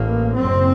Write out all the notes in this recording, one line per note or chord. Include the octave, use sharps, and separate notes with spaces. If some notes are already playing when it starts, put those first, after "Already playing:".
Already playing: A1 A2 A#3
F#1 F#2 C4